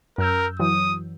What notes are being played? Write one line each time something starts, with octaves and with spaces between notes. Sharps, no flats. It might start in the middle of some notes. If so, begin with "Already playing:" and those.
F#2 A#4 E6 G6
E3 F#3 D#6